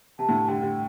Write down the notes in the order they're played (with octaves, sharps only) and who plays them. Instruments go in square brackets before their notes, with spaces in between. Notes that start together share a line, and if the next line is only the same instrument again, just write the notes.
[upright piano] C3 [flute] A5
[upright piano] A2 D3
[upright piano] D3 G3 [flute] G5
[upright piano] D3 G3